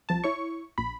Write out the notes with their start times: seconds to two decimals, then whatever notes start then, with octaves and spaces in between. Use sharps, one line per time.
0.09 C2 F3 A5
0.24 E4 C#5 C#6
0.78 A#1 B5